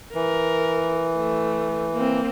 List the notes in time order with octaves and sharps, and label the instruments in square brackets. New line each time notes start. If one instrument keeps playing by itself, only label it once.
[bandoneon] E3 [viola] A#4
[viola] A3
A#3 C4